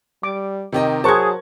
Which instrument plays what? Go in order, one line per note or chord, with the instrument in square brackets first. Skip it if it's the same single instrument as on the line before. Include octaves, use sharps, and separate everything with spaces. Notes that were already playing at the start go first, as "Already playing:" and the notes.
[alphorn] G3 [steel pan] D6
[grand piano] C3 G4 D#5 [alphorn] D#3
[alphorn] F#3 [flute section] G#4 [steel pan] A#4 C5 C#6 [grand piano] A5 F#6 G#6